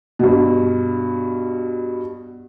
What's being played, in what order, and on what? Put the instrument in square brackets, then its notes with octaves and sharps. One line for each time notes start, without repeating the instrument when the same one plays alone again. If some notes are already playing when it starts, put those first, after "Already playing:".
[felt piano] G2 B2